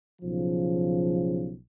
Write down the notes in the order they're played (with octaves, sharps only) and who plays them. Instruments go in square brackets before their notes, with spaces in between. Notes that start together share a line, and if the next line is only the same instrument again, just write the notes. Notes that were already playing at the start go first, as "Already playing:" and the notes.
[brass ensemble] B1 C#3 F3